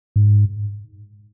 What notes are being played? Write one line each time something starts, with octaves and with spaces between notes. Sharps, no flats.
G#2